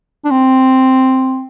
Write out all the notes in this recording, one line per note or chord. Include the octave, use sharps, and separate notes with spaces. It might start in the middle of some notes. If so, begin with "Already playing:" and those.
D4
C4